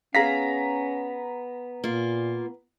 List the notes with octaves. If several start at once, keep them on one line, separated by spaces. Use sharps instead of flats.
B3 C#4 G#4 F5 A#5 A#6 B6
A#2 A#3 F4